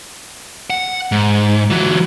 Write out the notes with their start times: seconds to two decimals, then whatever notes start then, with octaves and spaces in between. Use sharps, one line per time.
0.70 F#5
1.12 G#2
1.70 E3 F#3